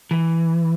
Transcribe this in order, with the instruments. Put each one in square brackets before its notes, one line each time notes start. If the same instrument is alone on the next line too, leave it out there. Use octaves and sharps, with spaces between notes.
[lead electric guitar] E3